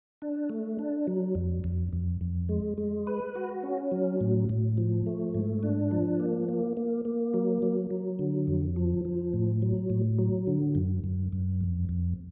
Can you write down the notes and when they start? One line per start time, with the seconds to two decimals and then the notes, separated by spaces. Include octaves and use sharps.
0.22 D4
0.49 A3
0.79 D4
1.07 F#3
1.35 F2
1.64 F2
1.93 F2
2.21 F2
2.49 G#3
2.78 G#3
3.07 B4
3.35 F#4
3.63 C#4
3.92 F#3
4.21 A2
4.49 A2
4.78 F3
5.06 A3
5.34 G#2
5.63 D4
5.91 F3
6.20 A#3
6.49 A#3
6.77 A#3
7.05 A#3
7.34 F#3
7.62 F#3
7.90 F#3
8.19 D3
8.47 F2
8.76 F3
9.05 F3
9.33 A2
9.62 F#3
9.90 A2
10.19 F#3
10.47 D3
10.75 F#2
11.04 F#2
11.33 F#2
11.61 F2
11.89 F2